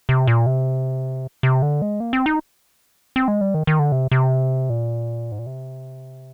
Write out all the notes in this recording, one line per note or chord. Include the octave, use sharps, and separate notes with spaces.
C3
A#2
C3
C3
D3
G#3
A#3
C4
D#4
C4
G#3
G3
D#3
D#3
D3
C3
C3
A#2
G#2
A#2
C3